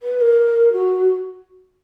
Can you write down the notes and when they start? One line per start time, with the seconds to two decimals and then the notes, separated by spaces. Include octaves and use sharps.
0.03 B4
0.21 A#4
0.72 F#4